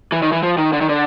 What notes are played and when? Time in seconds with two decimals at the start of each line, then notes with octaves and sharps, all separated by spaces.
0.12 E3
0.22 D#3
0.32 E3
0.43 F3
0.58 D#3
0.73 D3
0.81 D#3
0.89 D3